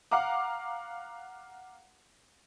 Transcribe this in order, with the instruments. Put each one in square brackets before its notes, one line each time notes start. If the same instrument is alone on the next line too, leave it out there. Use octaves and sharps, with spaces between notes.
[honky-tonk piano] F5 F#5 A#5 D6